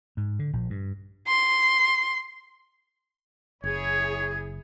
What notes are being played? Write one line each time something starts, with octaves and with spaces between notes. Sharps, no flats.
G#2
D3
A#1
G2
C6
F#1 E4 G#4 C#5 G#6